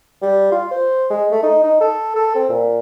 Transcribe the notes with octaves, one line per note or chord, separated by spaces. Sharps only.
G3
F4
C5
G#3
A3
D#4
D#4
A4
A4
C4
A#2